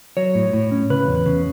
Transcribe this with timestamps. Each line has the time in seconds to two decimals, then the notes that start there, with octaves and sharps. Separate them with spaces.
0.17 F#3 C#5
0.35 A2
0.53 A2
0.71 C#4
0.90 C#3 B4
1.08 E2
1.26 C#3